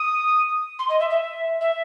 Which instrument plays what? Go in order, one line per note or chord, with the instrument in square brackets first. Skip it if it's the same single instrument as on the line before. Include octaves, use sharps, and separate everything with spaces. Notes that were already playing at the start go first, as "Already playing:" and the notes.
Already playing: [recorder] D#6
C6
D#5
E5
E5
E5